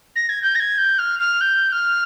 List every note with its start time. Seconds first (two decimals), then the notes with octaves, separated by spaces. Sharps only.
0.16 A#6
0.29 G#6
0.42 G6
0.55 A#6
0.60 G#6
0.78 G6
0.99 F6
1.20 F6
1.41 G6
1.72 F6